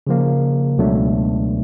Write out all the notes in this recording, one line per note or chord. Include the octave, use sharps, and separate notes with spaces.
C#3 F3 A#3
C#2 B2 F#3 A3 D4